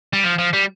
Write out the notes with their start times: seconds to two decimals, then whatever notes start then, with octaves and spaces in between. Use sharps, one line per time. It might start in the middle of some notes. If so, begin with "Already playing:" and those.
0.13 G3
0.24 F3
0.39 F3
0.53 G3